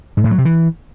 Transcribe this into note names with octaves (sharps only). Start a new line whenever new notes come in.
G#2
A2
F#3
C3
E3